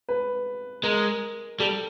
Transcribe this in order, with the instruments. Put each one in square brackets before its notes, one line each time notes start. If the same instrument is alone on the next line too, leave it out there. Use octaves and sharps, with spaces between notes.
[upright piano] B4
[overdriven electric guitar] G#3 [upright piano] A#4
[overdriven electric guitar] G3 [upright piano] A4